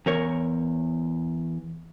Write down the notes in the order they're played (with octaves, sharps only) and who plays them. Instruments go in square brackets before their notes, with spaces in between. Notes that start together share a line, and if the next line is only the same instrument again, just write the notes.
[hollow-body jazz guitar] E2 A#4 C#5